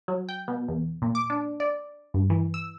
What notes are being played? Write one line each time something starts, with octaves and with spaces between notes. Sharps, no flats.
F#3
G5
B2
E2
A#2
D6
D4
D5
G2
E3
E6